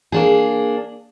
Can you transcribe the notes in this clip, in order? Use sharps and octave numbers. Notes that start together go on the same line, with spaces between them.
A#3 D4 G#4